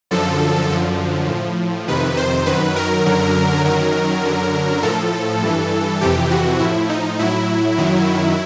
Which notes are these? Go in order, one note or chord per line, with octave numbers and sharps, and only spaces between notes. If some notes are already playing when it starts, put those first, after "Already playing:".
F#2 D3 F3 A4
F#2 D3 F3
A2 F3
F2 C3 D#3 B4
C5
F#2 D#3 F#3 B4
A#4
F#2 D3 F#3
F#2 D#3 F#3 A#4
F#2 D3 F#3
A2 F3 A4
G2 E3
F2 C3 E3 G4
F#4
A2 F3 E4
D#4
A2 F#3 E4
F#2 D#3 F#3